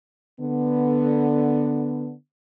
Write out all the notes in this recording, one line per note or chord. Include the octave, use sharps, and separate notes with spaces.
D3 B3